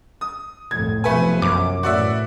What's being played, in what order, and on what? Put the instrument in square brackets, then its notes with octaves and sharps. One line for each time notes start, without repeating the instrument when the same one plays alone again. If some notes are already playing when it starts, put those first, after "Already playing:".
[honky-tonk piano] D#6
[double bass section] C2 F2 A2 [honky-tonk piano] G#6
[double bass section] B1 C3 F3 [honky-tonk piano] A3 B4 G#5
[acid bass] F#2 [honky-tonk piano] D6
[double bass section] A2 E3 [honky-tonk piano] F#4 D5 E5